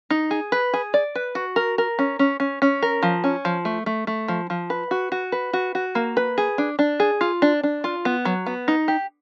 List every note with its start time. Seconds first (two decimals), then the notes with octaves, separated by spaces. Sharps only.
0.11 D#4
0.31 G#4
0.52 B4
0.74 G#4
0.94 D5
1.15 B4
1.35 F#4
1.56 A#4
1.78 A#4
1.99 C#4
2.19 C#4
2.40 C#4
2.62 C#4
2.82 A#4
3.03 F3
3.24 C#4
3.45 F3
3.65 A3
3.86 A3
4.07 A3
4.28 F3
4.50 F3
4.70 B4
4.91 F#4
5.12 F#4
5.32 B4
5.53 F#4
5.75 F#4
5.95 A#3
6.17 B4
6.38 G#4
6.58 D4
6.79 D4
7.00 G#4
7.21 F4
7.42 D4
7.63 D4
7.84 F4
8.05 B3
8.25 F#3
8.46 B3
8.68 D#4
8.88 G4